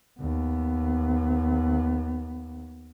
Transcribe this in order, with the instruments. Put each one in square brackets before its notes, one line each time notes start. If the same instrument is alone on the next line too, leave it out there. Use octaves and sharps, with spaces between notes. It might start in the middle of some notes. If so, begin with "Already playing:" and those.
[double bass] D#2 B3